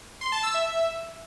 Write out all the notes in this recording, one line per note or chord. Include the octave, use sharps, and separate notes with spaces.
C6
A5
E6
E5